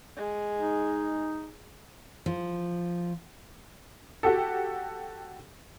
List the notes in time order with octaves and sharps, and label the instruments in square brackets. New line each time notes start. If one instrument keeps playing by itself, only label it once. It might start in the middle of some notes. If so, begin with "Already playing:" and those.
[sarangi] G#3
[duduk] D#4
[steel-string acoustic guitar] F3
[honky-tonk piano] F#4 G4 A4